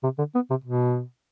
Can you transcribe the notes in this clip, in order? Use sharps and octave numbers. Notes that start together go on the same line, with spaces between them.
C3
D3
B3
C3
B2